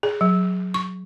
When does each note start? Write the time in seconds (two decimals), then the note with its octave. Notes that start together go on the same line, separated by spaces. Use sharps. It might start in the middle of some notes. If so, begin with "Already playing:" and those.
0.03 G#4
0.21 F#3
0.74 C#6